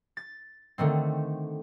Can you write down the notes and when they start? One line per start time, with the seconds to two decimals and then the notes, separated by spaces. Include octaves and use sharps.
0.17 A6
0.78 D3 D#3 A3 C4